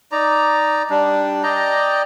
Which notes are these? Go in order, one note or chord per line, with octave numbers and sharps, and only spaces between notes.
D#4 D5 A#5
G3 D4
D5 D#5 G5 A#5